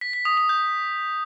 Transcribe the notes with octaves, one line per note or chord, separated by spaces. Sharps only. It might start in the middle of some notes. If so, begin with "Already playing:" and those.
B6
B6
D#6
D#6
G6